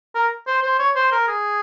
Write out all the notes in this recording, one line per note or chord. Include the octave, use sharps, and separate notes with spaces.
A#4
C5
C5
C#5
C5
A#4
G#4